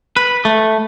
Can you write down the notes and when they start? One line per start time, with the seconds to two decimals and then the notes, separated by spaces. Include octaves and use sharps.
0.16 B4
0.45 A3